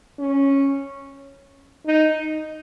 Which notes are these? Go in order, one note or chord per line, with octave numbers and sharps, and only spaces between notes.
C#4
D#4